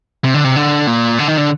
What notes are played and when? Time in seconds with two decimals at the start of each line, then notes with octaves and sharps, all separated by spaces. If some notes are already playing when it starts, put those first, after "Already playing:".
0.24 C3
0.34 D3
0.44 C3
0.56 D3
0.87 A#2
1.19 D3
1.28 D#3
1.37 D3